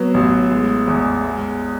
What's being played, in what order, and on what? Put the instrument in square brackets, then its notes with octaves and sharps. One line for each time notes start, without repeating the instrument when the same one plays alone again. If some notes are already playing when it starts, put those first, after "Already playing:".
Already playing: [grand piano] F#3 [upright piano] B3
[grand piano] A1
G#3
E2
G#3